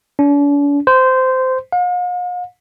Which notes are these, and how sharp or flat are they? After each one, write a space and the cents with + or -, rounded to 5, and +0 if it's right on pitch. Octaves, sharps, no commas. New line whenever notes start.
D4 -45
C5 -15
F5 +45